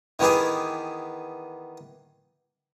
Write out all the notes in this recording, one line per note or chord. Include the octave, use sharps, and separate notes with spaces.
D#3 E3 B3 G4 G#4